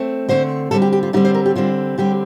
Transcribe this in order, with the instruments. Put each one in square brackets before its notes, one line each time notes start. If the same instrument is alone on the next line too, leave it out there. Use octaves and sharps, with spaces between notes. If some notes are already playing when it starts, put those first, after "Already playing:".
Already playing: [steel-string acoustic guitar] A3 C4
D3 A3 C4 C5
D3 G3 C4 A4
G4
G4
F4
D3 G3 C4 D#4
C5
A#4
G4
D3 G3 C4 F4
D3 G3 C4 G4